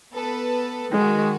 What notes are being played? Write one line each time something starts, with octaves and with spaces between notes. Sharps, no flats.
B3 A4 B4
D#3 G#3 F#4